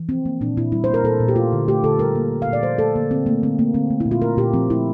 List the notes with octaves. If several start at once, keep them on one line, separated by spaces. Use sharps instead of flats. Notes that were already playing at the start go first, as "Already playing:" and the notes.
Already playing: E3
F3 C4
A#3
A#2 D4
A#2 E4
G3 E4
C5
A#3
A#4
A#2 A4
A#2
G4
A3 F4
D3
A3 G4
D3 A4
G3 A#4
A#3
A#2
F5
A#2
D5
F3 C5
A3 A4
D3 A#3
D3 C4
A3 A#3
D3 C4
A3 A#3
D3 C4
A3
E4
A#2
F4
A3 A#4
A#2 G4
F3 C4
A3 E4